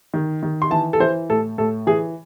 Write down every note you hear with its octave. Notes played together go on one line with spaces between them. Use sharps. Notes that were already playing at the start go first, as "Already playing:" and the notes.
D#3
D#3
C6
E3 A5
A4
E3 C5
A2 A4
A2 A4
E3 G#4